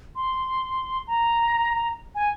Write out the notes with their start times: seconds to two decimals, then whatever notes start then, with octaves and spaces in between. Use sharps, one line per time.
0.16 C6
1.07 A#5
2.15 G#5